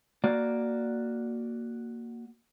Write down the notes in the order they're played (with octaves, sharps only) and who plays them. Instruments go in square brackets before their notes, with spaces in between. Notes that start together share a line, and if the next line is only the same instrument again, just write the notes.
[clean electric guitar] A#3 F#4 D5